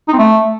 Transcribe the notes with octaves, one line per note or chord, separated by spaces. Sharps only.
D#4
C4
A3